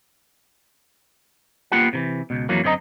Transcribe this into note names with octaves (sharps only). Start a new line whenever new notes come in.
A#3 B3 F4 G4 F#5
C3 D#3 E3
C#2 B2
F2 E3 F#3 A#3
F#2 D3 C4 C#4 D#5 A#5